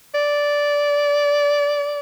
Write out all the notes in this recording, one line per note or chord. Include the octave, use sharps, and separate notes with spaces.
D5